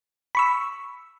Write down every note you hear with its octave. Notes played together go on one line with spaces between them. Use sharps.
B5 C#6 E6